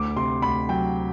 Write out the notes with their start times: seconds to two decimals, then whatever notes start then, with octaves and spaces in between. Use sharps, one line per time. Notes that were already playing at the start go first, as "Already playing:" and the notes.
Already playing: D2 D6
0.16 C3 C6
0.42 D2 B5
0.69 F#3 G5